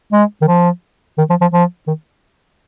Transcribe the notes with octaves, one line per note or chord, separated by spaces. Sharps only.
G#3
D#3
F3
D#3
F3
F3
F3
D#3